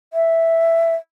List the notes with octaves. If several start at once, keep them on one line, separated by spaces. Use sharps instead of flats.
E5